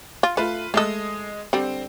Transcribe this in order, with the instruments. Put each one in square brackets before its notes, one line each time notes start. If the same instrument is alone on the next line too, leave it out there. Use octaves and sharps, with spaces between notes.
[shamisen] F4
[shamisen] A3 [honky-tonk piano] F4 B4
[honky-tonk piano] G#3 D#5 D#6 [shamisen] A3 A4
[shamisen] D3 G3 [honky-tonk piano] C4